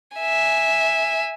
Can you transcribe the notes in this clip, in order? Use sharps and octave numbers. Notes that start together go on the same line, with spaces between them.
E5 G#5